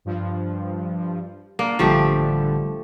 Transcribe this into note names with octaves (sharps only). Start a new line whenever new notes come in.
G2 F3
A#3 D4
A1 D3 F3 G3 A3 G4